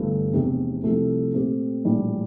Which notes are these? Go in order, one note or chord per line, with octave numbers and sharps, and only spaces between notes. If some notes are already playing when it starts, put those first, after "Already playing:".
Already playing: G1 G2 E3 A3
F1 E2 C3
C2 C3 F3 A3
A#2 A3 C4 G4
A#1 A2 E3 G3 D4